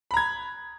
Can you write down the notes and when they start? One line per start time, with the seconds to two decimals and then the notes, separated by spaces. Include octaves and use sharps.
0.11 B5
0.14 A#5
0.17 G#6